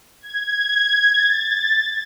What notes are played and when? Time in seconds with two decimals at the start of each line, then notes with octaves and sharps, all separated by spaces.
0.21 G#6
1.12 A6
1.41 A6